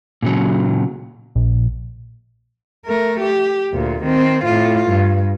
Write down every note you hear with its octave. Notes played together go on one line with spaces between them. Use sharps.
A#2 C#3 F#3
A#1
A3 A#4
G4
D2 A#2
D#3 C4
A2 F4
G2